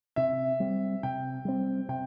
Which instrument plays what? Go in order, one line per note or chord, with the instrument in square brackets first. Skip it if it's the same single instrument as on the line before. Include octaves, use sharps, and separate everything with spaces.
[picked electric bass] C3 [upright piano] E5
[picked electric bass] G3 C4
[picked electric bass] C3 [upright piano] G5
[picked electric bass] G3 C4
[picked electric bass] C3 [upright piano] G5